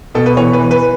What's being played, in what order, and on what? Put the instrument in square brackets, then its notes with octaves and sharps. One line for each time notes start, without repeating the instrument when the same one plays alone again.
[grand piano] B2 A4
B4
E3 C#5
B4
E3
B4